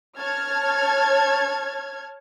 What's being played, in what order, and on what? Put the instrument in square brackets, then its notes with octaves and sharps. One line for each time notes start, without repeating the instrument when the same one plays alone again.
[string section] C#5 A5 F6 G#6